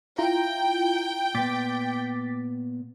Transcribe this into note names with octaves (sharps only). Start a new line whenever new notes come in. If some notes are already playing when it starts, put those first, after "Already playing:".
E4 F4 G5 A#5
A#2 B3 D6 A6 B6